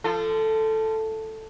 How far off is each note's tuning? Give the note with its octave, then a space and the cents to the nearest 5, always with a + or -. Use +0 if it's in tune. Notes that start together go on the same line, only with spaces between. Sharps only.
F3 -25 F4 -30 A4 +0